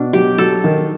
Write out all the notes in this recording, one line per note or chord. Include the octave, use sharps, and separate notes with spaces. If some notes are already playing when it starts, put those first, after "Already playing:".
Already playing: B2 D4
F#3 G4
F#3 A4
D#3